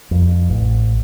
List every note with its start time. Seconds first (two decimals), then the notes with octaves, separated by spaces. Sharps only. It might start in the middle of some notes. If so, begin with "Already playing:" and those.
0.11 F2
0.49 A1